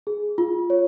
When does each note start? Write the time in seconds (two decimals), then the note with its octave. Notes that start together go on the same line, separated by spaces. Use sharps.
0.07 G#4
0.38 F4
0.70 C#5